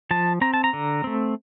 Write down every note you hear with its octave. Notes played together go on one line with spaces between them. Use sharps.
F3 A5
C4 A#5
A5
A#5
D3
A3 C4